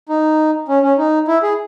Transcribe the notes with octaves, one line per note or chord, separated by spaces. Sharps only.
D#4
C#4
C#4
D#4
E4
G#4